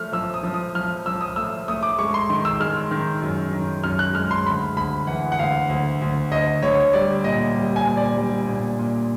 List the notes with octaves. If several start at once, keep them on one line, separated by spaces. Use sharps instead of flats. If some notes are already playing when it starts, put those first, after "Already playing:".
Already playing: F3 A3 F6
F3 E6
D#6
F3
D#6
F3 F6
F3 E6
D#6
A3 E6
A3 D#6
D6
G#3 C#6
C6
D#3
E6
G#3 F6
D#3
F#2
D#3
F#2 F6
F#6
G#3 F6
C6
D2 B5
D2 B5
E3 F#5
F#5
D2 F5
D2
D2
D2 D#5
D2 C#5
G3 D5
A#2 D#5
G3
G#5
A#2
D5
G3
A#2
A#2